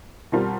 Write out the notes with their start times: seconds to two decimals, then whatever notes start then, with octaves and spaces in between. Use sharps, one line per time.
0.32 B2 G3 C4 F4 A#4